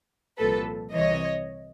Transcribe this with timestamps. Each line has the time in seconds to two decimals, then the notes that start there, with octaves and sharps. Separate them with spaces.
0.39 C2 A#2 F3 A4 B4
0.93 C2 C3 E3 C#5 D#5